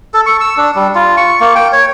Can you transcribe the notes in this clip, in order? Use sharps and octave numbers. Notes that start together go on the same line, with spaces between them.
A4
C#6
E6
D4
G3
F4
C#6
A#3
G5
C#5